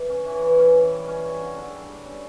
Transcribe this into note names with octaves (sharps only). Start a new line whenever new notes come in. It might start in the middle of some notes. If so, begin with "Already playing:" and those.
Already playing: E3
C#4
E3
E3
C#4
E3
G3
C#4
C#4
D3
D3
G3
G3
C#4